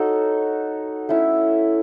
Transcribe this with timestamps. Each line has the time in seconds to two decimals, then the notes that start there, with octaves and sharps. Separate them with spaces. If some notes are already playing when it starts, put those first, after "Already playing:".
Already playing: D#4 F#4 A4 C#5
1.09 A3 C#4 E4